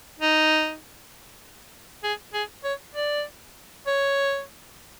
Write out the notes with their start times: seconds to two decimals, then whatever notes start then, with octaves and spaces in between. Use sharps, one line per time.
0.20 D#4
2.04 G#4
2.34 G#4
2.64 C#5
2.95 D5
3.87 C#5